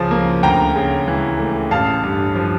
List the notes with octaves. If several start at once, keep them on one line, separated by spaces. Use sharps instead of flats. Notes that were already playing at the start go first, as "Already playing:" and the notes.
Already playing: C#2 C#3 F3
A#3
D2 G5 A#5
C#3
E3
A3
A1 F5 A5
G2
F3